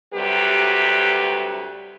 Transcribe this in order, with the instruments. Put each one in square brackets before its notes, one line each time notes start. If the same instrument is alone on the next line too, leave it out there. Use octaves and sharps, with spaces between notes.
[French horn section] D2 C3 F#3 G3 G4 B4